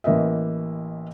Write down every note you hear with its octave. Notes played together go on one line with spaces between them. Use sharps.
A1 E3 A#3 D#5 E5